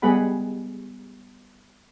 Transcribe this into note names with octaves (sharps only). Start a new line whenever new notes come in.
G3 G#3 B3 G#4 F#5 B5